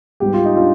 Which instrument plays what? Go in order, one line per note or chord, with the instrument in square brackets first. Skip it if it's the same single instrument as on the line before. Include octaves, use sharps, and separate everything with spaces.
[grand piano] G#2 G3 B3 G4
F4
D#4
D4 F4